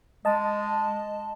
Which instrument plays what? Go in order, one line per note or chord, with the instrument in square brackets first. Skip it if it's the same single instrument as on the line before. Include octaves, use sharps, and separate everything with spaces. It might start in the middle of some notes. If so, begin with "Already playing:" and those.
[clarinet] G#3 [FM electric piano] D#5 A5